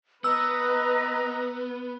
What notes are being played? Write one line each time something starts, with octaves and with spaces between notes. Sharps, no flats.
B3 B4 D#5 A#5 D#6 E6